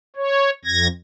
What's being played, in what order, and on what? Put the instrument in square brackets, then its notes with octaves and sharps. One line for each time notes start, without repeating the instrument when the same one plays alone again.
[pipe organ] C#5
F2 G#6 A#6